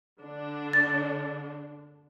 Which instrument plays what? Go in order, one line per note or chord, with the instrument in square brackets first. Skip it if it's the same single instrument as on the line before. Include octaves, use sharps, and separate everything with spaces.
[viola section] D3 D4
[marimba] A6